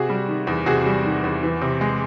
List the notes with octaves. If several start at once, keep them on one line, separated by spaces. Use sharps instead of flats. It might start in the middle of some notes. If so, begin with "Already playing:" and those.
Already playing: C3 F#4 G#4
G3
D#3
E2
C3 F#4 G#4
G3
D#3
E2
E3
C3
G#3